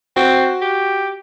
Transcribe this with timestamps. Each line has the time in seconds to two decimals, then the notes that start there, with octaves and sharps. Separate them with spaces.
0.16 C4 F#4
0.62 G4